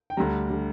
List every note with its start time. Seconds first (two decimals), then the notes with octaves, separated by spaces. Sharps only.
0.10 G5
0.17 D2 D3 G3 A#5
0.50 D3 G3